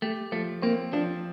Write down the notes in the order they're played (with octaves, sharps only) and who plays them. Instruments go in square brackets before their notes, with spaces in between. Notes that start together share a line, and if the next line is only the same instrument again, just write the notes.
[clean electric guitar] A3 [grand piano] G4
[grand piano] F3 [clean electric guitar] A3
[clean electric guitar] A#3 [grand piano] C4
[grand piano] F3 [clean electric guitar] D4